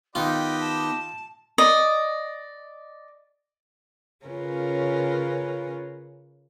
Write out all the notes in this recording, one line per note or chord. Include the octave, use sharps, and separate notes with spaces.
D#3 B3 D#4 F4 G4 D#5 G5 B5
A5
D5 D#5
C#3 C#4 F4 A#4 B4